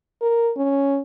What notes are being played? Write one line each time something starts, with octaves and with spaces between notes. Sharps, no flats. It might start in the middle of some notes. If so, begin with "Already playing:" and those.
A#4
C#4